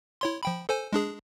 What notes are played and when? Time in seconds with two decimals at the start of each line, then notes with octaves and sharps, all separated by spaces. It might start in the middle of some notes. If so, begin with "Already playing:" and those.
0.21 E4 C#5 C6
0.43 F3 G5 B5
0.69 A4 C5 G#5
0.93 G#3 D4 G#4